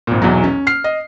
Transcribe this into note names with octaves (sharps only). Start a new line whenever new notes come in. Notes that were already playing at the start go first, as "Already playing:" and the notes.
G#1 A#2
B1 E2 E3 F#3
C#4
F6 C7
D#5